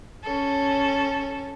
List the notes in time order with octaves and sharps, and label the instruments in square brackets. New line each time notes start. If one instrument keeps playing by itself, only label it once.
[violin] C#4 A4